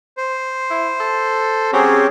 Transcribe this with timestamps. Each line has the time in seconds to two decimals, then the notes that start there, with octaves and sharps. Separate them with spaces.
0.17 C5
0.70 E4
1.00 A4
1.73 F#3 C4 C#4 G4 G#4